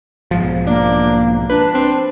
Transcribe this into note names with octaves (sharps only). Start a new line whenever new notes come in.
B1 G#2 F3
A#3 D4
D4 B4
C4